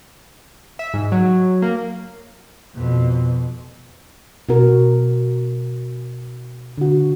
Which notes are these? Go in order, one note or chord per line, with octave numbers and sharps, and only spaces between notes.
E5
G#2
F#3
A#3
F2 B2
B2 F#4 A#4
D3 F#4